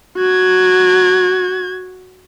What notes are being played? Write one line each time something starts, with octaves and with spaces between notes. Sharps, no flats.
F#4 G#6